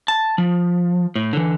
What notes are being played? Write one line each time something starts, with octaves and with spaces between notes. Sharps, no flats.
A5
F3
A2
D3 E3